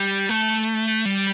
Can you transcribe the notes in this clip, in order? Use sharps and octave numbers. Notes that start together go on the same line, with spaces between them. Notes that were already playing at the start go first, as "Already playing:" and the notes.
Already playing: G3
A3
G3